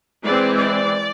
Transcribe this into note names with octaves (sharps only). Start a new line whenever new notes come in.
E3 G#3 C4 D5
D5